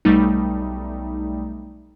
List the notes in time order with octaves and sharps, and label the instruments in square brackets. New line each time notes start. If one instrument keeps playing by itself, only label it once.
[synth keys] B1 G3 A3 D#4